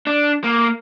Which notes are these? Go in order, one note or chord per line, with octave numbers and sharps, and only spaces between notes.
D4
A#3